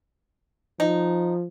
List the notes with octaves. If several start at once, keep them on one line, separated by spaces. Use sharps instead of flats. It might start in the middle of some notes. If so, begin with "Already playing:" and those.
F3 D#4